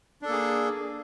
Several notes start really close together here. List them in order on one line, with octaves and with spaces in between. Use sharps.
D4 A4 A#3 G#4